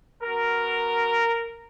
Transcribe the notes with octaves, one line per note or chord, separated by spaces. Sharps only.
B3 F#4 A#4